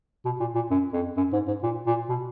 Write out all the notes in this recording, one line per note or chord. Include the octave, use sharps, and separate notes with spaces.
B2
A#2
A#2
F#2
F2
F#2
G#2
G#2
A#2
A#2
B2